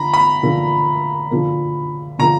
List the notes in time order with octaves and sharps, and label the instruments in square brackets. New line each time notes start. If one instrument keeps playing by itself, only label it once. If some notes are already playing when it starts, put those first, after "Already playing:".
Already playing: [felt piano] D3 F3 [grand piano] A#5 B5
[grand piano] B5
[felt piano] D3 F3 A#3
D3 F3 A#3
[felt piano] D3 F3 A#3 [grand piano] A#5